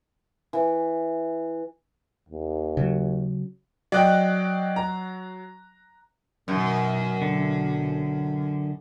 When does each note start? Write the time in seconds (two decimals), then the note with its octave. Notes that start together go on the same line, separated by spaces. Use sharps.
0.53 E3
2.29 D#2
2.77 C#3 F#3
3.92 F#3 D5 D#5 G5 F#6
4.76 A#5
6.48 F#2 B2 D#3
7.22 B1 D3